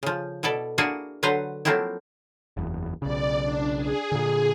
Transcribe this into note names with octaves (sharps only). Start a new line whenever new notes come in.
C#3 F3
B2 E4 A4 D5
A#3 D4 E4 F#4 G#4
D3 F#3 F#4 B4 C5 A#5
F3 F#3 A3 A#3 C4 E4
F#1 E2
B1 C#3 D5
D4
G#4
A#2 D3